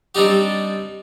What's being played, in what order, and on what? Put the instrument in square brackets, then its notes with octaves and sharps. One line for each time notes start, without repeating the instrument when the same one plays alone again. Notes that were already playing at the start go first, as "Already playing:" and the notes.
[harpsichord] G3 C4 D4 D#4 G4